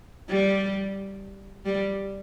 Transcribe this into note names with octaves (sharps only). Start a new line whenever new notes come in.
G3
G3